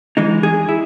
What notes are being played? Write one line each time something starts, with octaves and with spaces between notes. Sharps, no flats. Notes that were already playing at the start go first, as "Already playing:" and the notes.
E3 G#3 D#4
E2 G#4
E4